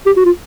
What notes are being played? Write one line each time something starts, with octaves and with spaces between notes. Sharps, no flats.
G4
F#4
F4